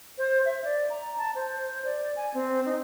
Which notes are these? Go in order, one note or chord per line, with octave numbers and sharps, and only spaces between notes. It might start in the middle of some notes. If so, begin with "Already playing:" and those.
C5
E5
D5
A#5
A5
C5
D5
G#5
C4
D#4